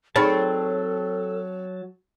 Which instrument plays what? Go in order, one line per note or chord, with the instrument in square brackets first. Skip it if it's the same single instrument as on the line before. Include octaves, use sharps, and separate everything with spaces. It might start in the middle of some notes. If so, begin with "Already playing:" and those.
[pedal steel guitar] F#3 A5 [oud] C4 C#5 [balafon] D#4 G#4 B5 [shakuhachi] A4